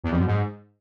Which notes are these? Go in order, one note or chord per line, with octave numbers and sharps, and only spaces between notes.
E2
F2
F#2
G#2